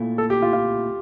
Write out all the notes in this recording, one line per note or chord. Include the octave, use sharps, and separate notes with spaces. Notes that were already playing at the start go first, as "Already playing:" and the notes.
Already playing: A#2 A3 E4
A4
G4
F4
F4